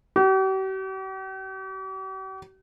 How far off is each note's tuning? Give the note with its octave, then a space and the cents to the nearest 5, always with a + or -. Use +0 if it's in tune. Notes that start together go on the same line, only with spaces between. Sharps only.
G4 -45